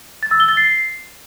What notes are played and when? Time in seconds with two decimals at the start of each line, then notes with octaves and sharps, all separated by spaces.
0.23 A6
0.31 E6
0.40 G7
0.49 A6
0.57 C7